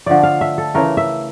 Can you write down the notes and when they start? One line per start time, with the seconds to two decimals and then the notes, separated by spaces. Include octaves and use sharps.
0.06 D3 F3 A3 D5
0.23 F5
0.41 E5
0.58 A4
0.74 C#3 E3 A3 A#4
0.97 E5